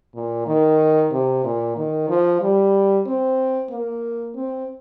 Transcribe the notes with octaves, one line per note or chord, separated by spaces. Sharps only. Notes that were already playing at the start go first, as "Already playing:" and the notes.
A#2
D#3
C3
A#2
D#3
F3
G3
C4
A#3
C4